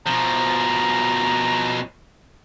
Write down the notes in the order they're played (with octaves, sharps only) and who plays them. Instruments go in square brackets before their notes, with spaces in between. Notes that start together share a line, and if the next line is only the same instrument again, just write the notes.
[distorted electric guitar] B2 F3 [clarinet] A#5